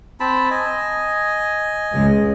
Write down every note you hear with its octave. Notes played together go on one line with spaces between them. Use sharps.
C4 A5 B5
D#5 G#5
C#2 G#3